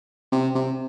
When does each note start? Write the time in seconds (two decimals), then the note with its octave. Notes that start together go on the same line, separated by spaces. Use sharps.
0.32 C3
0.55 C3